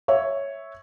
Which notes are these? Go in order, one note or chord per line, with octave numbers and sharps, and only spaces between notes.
C#5 E5